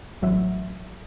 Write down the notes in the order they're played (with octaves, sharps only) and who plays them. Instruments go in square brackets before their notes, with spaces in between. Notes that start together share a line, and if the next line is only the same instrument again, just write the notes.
[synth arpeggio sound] A1 F#3 E5